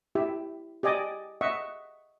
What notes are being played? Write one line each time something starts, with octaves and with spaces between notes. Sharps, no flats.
E4 G4 E5
G4 D5 D#5 G#5 D6
D#5 E5 F#5 C#6